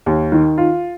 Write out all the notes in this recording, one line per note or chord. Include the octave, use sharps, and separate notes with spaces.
D#2
D#3
F4